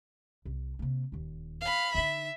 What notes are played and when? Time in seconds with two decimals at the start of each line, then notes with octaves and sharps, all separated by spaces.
0.45 C2
0.79 C3 A#3
1.12 D#1 D#2
1.61 F5 B5
1.95 D3 D#4 E5